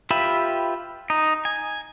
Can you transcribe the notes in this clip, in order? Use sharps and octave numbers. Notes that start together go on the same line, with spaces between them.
F4 G4 B4 E5 B5
D#4
G#5